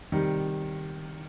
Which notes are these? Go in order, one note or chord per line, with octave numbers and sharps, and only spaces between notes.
C3 D#3 G3